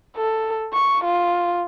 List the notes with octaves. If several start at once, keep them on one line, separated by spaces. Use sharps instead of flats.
A4
C#6
F4